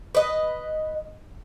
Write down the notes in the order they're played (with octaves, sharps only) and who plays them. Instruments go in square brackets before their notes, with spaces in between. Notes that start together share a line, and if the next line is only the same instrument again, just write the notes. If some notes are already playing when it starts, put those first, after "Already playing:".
[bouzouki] B4 D#5